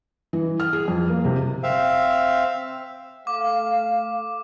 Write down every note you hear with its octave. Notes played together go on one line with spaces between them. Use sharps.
E3
F6
G#4
F2
A#3
C3
C4 E5 F5
A3 F5 D6